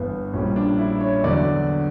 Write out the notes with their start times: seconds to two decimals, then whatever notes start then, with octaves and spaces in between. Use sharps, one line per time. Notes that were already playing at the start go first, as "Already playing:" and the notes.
Already playing: G1 G2 E3 B3
0.33 A#1 A#2 G3 C#4
0.56 D4
0.78 E4
1.01 C#5
1.23 E2 D3 F#3 D5